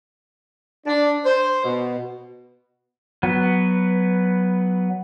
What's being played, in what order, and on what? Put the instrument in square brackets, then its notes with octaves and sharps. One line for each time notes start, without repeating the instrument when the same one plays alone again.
[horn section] D4
C5
B2
[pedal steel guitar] F#3 B3 B4